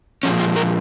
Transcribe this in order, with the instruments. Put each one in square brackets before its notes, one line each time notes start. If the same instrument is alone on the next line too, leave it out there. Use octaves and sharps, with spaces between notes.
[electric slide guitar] A#2 F3 G#3 C#4
F4
A#4